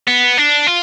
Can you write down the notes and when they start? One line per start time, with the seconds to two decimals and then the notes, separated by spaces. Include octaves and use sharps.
0.08 B3
0.38 D4
0.67 F4